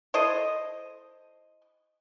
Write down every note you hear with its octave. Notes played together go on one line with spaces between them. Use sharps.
E4 A4 C5 D#5